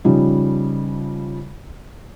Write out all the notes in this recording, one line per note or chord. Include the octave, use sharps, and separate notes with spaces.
C#3 F3 G3 D#4